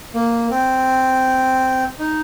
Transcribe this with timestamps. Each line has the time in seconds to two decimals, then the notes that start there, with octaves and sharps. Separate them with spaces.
0.14 A#3
0.50 C4
1.99 D#4